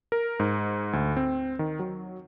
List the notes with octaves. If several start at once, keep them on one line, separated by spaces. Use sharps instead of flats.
A#4
G#2
D2
C4
D#3
F#3